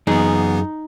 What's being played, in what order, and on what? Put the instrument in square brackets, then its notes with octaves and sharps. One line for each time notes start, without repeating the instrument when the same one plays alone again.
[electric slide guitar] F#2 G#4 [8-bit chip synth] E3 B3 [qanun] D#4